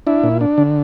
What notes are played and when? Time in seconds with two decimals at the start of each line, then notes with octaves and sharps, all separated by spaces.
0.07 D4 E4
0.23 A#2
0.41 D4
0.58 D3